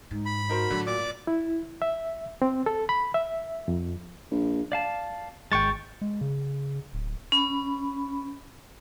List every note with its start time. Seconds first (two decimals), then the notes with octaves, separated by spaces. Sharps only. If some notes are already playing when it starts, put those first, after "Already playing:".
0.11 G#2 D#4
0.26 B5
0.49 D#4 F#4 A#4 C5
0.71 A2 D3 F#3
0.87 A#2 D5 D6
1.27 E4
1.82 E5
2.42 C4
2.66 A4
2.89 B5
3.14 E5
3.68 F2
4.31 A#1
4.72 D5 F5 A5
5.52 G#1 G#3 G5 C#6 A6
6.02 G#3
6.21 C#3
6.93 D1
7.32 C#4 B5